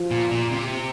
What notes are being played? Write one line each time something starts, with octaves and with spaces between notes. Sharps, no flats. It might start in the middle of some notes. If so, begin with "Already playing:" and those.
Already playing: F3
A#2
A#2
C3